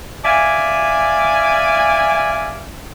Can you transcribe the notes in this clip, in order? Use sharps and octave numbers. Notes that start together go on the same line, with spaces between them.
D5 E5 F5 G#5